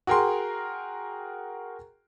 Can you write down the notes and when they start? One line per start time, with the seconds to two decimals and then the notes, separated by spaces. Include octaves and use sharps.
0.07 F#4 G#4 A#4 G5 C6